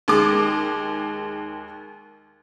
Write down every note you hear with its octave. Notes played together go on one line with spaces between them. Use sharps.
D#2 G#3 D6